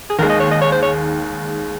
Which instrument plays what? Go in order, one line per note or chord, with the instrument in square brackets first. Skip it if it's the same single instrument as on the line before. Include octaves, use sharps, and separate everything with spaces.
[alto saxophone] G#4
[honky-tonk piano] D#2 D#3 G#3 [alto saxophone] A#4
[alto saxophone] D#5
C#5
D#5
C#5
C5
C#5